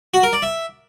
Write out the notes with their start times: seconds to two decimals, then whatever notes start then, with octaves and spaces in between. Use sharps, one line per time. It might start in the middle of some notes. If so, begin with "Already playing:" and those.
0.14 F#4
0.23 A#4
0.33 D5
0.42 E5